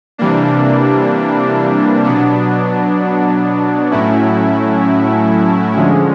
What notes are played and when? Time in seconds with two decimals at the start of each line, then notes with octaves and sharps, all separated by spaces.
0.18 C3 E3 G3 A#3 D4
2.04 B2 F#3 B3 D4
3.91 A2 F#3 A3 C#4 E4
5.76 D3 F3 G#3 C#4